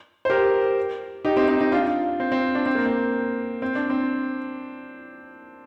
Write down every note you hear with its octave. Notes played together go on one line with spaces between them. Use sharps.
C5
G4 A#4
D#4 G4
C4 D#4
C4 D#4
D#4
D4 F4
C4
C4
D4
C4
A#3
C4
C4
D4
C4